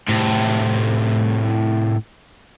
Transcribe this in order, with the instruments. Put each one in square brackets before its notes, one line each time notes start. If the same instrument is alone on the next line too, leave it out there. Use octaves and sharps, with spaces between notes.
[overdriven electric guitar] A2 C3